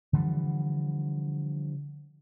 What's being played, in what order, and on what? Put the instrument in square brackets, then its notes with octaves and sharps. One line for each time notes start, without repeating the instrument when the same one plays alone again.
[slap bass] D3 E3 F3 G3